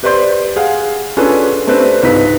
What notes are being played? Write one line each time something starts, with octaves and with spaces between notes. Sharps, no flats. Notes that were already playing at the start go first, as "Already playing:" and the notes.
G4 B4 C5 D5 C6 G6
G#4 F5 F#5
C#4 D4 F4 G#4 A4 B4
A3 C4 D4 G4 B4
C#2 G#2 B4 B6